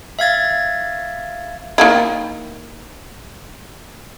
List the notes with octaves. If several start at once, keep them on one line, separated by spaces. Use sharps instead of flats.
E5 F5 G#6 A6
D#3 A#3 E4